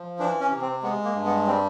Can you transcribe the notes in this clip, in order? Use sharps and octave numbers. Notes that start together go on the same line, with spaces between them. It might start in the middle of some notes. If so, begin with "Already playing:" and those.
Already playing: F3
E3 D4
C#4
C3
C4
G#3 B3
A#3
G2
B3
G3 C4